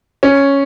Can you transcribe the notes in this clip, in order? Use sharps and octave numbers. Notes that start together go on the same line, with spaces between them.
C#4